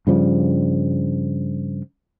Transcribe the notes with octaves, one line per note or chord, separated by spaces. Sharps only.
G2 C#3 F3 G3